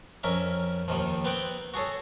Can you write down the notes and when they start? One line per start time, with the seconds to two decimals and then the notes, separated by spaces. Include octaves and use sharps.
0.23 F2 C#4 A#4 E5
0.88 D#2 D#3 F3
1.25 B3 C4 F#5 G5
1.74 F#4 G#4 A4 C#5